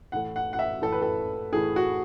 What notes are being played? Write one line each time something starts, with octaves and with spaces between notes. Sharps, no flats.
A2 E3 A3 F#5
F#5
F#5
E5
A2 E3 A3 A4
B4
A4
A2 E3 A3 G#4
F#4